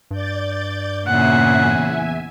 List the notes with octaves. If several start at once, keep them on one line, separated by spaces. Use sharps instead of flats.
G2 D5 G6 A6
E2 A#2 C#3 E5 F#5 G#5